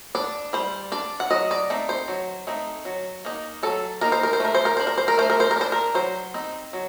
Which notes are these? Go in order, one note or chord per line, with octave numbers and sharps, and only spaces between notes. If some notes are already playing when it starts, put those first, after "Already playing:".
D4 D5
G3 C5
D4 D5
F#5
F#3 D#5
D5
A3 C4 D#4
C5
F#3
A3 C4 D#4
F#3
A#3 D#4
F#3 A4
A#3 D#4 A#4
C5
A#4
C5
A3 A#4
C5
A#4
D4 C5
A#4
C5
A#4
A3 C5
A#4
C5
A#4
D4 C5
A#4
F#3 C5
C4 D#4
F#3